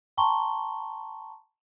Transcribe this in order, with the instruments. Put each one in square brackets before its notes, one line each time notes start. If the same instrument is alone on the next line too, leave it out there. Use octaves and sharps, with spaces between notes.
[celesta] G5 A5 A#5 C6 C#6 G7